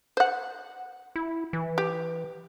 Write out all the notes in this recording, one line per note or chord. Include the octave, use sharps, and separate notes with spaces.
C5 F#5
E4
E3
G4